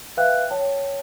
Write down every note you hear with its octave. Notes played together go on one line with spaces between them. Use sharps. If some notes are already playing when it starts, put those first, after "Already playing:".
B4 E5 F5 G5 F#6
C#5 G5 A5